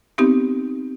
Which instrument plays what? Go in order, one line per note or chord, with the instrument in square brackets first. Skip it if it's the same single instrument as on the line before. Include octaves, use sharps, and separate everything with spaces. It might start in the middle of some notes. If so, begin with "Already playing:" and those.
[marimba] B3 C4 D#4 G4